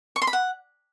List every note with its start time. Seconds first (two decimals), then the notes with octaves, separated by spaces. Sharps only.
0.16 C#6
0.22 C6
0.27 B5
0.33 F#5